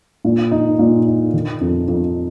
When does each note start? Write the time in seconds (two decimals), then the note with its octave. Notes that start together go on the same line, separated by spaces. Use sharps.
0.25 A#2
0.51 D#4
0.79 A#2
1.06 D#4
1.34 D#3
1.61 F2
1.88 F2